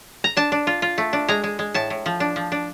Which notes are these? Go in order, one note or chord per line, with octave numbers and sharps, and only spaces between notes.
A#5
D4 A5
D4
F4
F4
A3
D4
G#3 A#5
G#3
G#3
A2 A5
A2
F3
D4
F3
D4